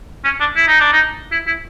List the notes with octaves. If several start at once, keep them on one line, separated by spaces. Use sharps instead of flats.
C#4
D4
E4
D#4
D4
D#4
E4
E4